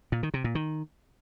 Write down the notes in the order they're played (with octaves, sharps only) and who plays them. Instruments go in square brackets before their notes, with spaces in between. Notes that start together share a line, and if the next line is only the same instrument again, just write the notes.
[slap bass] A#2
D#3
C3
A#2
D#3